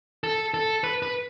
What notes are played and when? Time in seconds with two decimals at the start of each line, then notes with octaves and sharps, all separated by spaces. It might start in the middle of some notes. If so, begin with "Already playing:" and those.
0.24 A4
0.54 A4
0.84 B4
1.02 B4